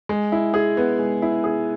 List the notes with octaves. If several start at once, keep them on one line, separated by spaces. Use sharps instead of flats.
G#3
E4
G#4
B3
G#3
E4
G#4